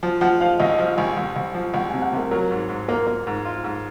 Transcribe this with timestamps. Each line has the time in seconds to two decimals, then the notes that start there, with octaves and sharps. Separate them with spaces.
0.03 F3
0.21 F3 F#5
0.41 F3 F5
0.60 C2 D#5
0.78 F3
0.98 C2 G#5
1.17 C2
1.36 C2
1.54 F3
1.74 C2 F#5
1.89 G#5
1.94 C3
2.02 F#5
2.12 C3 A#4
2.31 F#3 A#4
2.51 G#2
2.69 G#2
2.88 A#3 A#4
3.07 A#3
3.27 G#2
3.45 F4
3.64 G#2